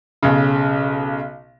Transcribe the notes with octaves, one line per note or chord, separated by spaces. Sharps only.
B1 C#3